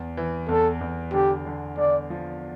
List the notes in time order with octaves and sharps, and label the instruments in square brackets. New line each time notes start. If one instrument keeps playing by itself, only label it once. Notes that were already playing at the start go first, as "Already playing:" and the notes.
Already playing: [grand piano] E2
E3
[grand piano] E2 [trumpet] A4
[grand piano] E2
[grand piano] D3 [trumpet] G4
[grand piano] D3
[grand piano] D3 [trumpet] D5
[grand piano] F3